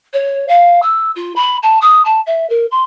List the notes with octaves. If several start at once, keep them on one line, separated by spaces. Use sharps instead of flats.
C#5
F5
E6
F4
B5
A5
D#6
A5
E5
A#4
C6